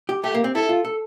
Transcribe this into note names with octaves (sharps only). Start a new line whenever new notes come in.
G4
A3 G4
A#3
C4
E4 A4
F4
A4